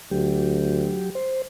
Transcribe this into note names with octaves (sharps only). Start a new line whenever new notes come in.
D2 F#3 G4
C5